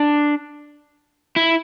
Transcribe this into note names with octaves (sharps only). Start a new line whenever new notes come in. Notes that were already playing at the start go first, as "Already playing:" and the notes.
Already playing: D4
E4